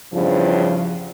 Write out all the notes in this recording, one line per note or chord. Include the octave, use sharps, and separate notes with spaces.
E2 G2 C#3 F3